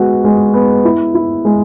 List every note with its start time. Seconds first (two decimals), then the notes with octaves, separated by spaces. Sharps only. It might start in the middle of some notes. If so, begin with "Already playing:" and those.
Already playing: G#3 B3 F#4
0.24 G#3
0.54 B3
0.85 E4
1.14 E4
1.45 G#3